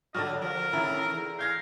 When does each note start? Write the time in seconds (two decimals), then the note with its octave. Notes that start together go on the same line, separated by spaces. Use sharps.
0.14 D3 F#3 G3 D4 F#4 D#5 F6
0.42 F3 A#4
0.73 A2 C3 D#3 E4 A#5
1.09 E2
1.39 F5 G6 G#6 A#6